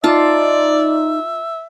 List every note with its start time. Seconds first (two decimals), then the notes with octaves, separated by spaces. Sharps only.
0.04 D#4 F4 D5 E5 A5